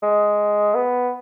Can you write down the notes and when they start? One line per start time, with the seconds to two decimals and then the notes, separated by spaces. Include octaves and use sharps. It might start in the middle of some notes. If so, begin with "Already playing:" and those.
0.03 G#3
0.75 B3